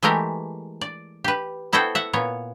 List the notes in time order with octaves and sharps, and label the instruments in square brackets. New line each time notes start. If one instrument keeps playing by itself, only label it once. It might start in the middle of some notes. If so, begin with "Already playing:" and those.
[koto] E3 G#3 A3 G4 A#4
D5
G4 B4
B3 E4 F#4 A4 C5 G5
E5 F#5
A#2 B3 C#5